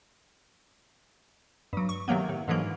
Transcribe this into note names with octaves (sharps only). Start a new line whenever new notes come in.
G2 F#3
C#6
C3 D#3 F#3 A#3 B3
A2 C3
G#2 D3 E3 F#3 A#3